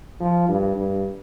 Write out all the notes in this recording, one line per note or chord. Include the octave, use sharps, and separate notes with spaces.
F3
G2
G2